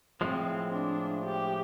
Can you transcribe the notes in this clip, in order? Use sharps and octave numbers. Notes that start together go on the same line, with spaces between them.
A2 F3 G#3 C4
D4
G4